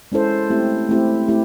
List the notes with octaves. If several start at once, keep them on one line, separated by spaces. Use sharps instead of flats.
G#3 C#4 E4 A4 C5
A3 C4 E4 G4
A3 C4 E4 G4
A3 C4 E4 G4